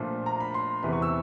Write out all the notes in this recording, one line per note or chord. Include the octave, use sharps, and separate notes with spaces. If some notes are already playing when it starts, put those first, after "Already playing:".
Already playing: A#2 F3 A3 D4 F4
A#5
B5
C6
E2 C3 E3 B5
C#6
E6